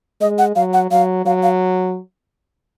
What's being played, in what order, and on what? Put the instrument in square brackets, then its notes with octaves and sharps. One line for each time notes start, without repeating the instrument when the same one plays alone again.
[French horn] G#3 [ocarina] D#5
[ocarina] F#5
[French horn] F#3 [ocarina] F5
[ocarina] F#5
[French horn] F#3 [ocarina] F5
[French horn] F#3 [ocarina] F5
[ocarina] F5